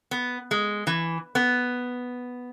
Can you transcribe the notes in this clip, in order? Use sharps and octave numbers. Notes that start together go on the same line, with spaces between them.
B3
G#3
E3
B3